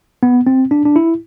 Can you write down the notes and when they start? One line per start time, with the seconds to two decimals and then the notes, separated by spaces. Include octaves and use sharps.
0.23 B3
0.47 C4
0.71 D4
0.85 D4
0.96 E4